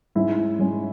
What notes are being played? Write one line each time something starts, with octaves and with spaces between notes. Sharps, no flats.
G#2 G#3 C#4 E4
G#2 G#3 C#4